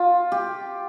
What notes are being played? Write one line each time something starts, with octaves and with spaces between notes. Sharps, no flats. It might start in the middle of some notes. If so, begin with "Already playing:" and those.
Already playing: F4
G4